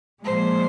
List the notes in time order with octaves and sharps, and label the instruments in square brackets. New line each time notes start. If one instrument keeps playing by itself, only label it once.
[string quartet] A#2 F3 G#3 C5